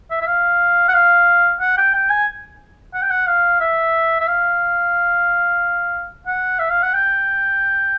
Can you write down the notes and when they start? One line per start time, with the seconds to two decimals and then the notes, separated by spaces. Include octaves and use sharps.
0.11 E5
0.21 E5
0.27 F5
0.88 F#5
0.94 F5
1.60 F#5
1.77 G5
1.94 G5
2.10 G#5
2.94 F#5
3.02 G5
3.10 F#5
3.27 F5
3.60 E5
4.20 E5
4.27 F5
6.26 F#5
6.59 E5
6.70 F5
6.82 F#5
6.94 G5